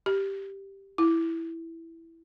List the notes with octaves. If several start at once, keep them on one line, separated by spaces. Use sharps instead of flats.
G4
E4